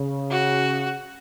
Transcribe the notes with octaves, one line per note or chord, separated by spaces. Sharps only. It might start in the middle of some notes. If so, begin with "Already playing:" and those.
Already playing: C#3
F#4